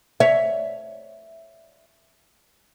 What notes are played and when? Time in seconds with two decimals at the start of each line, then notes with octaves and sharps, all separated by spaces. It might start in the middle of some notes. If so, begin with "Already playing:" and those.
0.20 C#5 E5